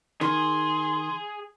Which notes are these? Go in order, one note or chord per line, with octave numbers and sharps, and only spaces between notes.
D#3 G#4 C6